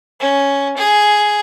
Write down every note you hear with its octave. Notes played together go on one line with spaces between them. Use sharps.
C#4
G#4